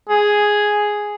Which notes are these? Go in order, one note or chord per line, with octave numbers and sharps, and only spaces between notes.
G#4